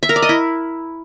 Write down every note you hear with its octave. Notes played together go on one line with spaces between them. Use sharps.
E5
A#4
D5
D#5
E4